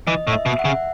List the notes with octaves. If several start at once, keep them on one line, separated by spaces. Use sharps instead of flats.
E3 D#5
A2
E5
B2
E5
F#5
C#3